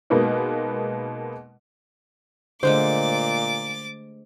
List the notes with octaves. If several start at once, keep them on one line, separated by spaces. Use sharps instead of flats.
B2 G#3 A#3 B3 D#4
A#2 D3 G#3 A3 C5 D6 A6